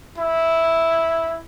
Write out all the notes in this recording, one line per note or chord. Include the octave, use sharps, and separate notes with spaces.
E4